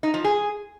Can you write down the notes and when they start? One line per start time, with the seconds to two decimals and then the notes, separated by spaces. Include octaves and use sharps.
0.03 D#4
0.14 F3
0.24 G#4